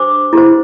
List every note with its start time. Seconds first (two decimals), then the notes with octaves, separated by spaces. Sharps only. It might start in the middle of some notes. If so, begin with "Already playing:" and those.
Already playing: D4 G4 C5 D6
0.33 E4 G4 C5